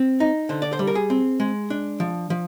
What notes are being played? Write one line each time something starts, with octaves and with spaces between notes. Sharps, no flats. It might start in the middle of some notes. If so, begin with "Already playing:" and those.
Already playing: C4
D#4
D3 C5
D5
C5
G3
A#4
G#4
C4
G#3
D4
F3
F3